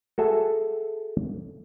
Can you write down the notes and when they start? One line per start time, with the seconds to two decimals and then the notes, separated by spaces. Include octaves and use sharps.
0.18 F#4 G#4 A4 E5